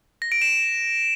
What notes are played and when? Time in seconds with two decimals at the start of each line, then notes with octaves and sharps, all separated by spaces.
0.22 A#6
0.32 D7
0.42 E7